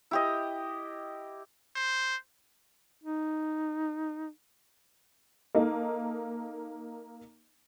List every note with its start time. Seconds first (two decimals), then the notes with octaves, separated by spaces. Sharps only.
0.11 E4 G4 D#5
1.76 C5
3.03 D#4
5.55 A#3 D#4 A4 D#5